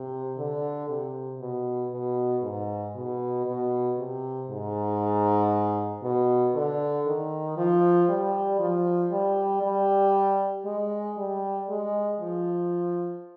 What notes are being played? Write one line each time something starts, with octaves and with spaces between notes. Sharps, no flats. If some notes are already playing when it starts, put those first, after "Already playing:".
Already playing: C3
D3
C3
B2
B2
G#2
B2
B2
C3
G#2
B2
D3
D#3
F3
G3
F3
G3
G3
G#3
G3
G#3
F3